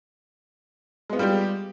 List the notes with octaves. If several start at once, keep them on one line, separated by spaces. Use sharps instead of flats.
G3 G#3 B3 F4 G4